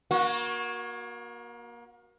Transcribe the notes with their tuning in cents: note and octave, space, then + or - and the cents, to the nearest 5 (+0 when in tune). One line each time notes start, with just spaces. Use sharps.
A#3 +30 F#4 -15